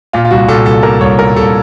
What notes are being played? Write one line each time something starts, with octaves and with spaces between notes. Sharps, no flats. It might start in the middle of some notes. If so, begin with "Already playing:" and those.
A#2 F4
F4
C2 F#4
A#2 A4
C2 A4
A#2 A#4
C2 C#5
A#2 A#4
C2 A4